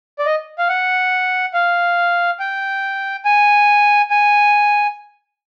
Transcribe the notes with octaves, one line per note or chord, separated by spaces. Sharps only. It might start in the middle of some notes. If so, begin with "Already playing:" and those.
D5
D#5
F5
F#5
F5
G5
G#5
G#5